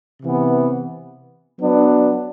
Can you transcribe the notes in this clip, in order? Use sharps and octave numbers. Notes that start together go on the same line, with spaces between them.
C3 E3 B3
F#3 B3 D4